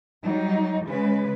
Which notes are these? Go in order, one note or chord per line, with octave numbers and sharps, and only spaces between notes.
F#3 G3 D#4
C#3 G#3 B4